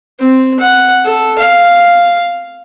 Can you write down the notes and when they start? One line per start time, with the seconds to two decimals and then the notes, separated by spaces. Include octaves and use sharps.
0.20 C4
0.60 F#5
1.05 A4
1.39 F5